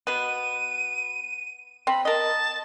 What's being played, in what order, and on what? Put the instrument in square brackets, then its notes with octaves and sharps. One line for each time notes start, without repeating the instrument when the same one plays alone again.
[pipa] B2 B3 [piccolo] D#7
[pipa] C4 [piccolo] B5
[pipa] A#4 D#5 [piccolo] A5